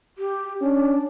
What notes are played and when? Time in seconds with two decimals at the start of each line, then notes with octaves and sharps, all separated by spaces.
0.18 G4
0.61 C#4 D4